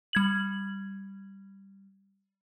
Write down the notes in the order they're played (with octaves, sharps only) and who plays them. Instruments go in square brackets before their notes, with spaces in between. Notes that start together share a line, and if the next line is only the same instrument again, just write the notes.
[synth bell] G3 G#6 F#7